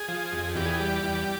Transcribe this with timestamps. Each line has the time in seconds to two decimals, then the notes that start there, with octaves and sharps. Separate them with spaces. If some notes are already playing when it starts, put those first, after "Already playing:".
Already playing: G#4
0.08 F3
0.33 F2
0.55 E2 G4
0.66 G#4
0.75 G4
0.81 G3
1.04 E2